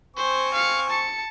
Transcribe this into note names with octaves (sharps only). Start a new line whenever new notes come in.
C4 C5 G#5 C#6
F5 C#7
A5 C#7